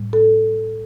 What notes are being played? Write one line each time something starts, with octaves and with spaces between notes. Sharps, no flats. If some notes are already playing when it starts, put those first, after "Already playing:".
Already playing: A2 G3
A4